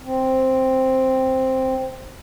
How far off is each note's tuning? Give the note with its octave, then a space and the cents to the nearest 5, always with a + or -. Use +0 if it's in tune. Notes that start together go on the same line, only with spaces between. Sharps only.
C4 +0